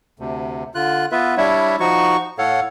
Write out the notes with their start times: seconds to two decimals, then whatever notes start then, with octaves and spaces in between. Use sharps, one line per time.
0.19 D2 C3
0.75 D3 F4 F#6
1.12 B3 F4 B4 E5
1.37 G3 D4 E4 C#5 E5
1.80 F3 D#4 F#4 C#6
2.38 A2 A4 C#5 F5 F#5